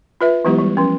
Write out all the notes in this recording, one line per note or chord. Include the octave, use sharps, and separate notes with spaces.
F4 B4 E5
E3 F#3 G#3 B3 E4 G4
G3
F3 C#4